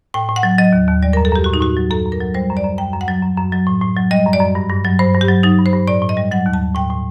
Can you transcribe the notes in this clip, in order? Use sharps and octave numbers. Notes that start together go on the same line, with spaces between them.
A2 G5
A2
F#5
F#3
F#3 D#5
D#2
D#2
G3 D5
F#2 A#4
A4
F#2 G4
A2 F#4
D#4
A2 F#4
F#3
F#2 A4
F#2
A#4
F#3
G3 C5
F#2
D5
F#2
F#2 G5
F#2
F#5
F#3
F#2
F#2
F#3
A2
A2
F#3
G3 D#5
F#2
D5
F#2
G2
G2
F#3
G2 C5
G2
G4
F#3
F#3 D#4
G2
C5
G2
A2 D5
A2
D#5
G3
F#3 F#5
D#2
A5
D#2
A2 G5
A2